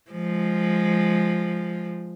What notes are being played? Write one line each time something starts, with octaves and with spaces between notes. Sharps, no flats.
F3 G#3